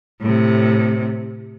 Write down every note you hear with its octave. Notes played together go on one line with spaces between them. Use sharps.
A2 C3